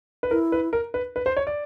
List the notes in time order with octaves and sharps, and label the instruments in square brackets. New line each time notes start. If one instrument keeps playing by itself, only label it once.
[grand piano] B4
[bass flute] E4 [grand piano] A#4
[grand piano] B4
A#4
B4
B4
C5
C#5
D5